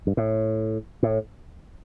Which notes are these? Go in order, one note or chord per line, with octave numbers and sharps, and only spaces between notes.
G2
A2
A2